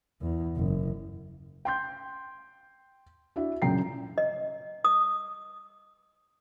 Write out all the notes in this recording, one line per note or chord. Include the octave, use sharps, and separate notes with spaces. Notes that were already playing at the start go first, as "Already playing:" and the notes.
E2
F#1
G5 C6 G6
D4 E4 F#4 E5
F#2 A#2 C#3 G5 A#5 C7
D#5
D#6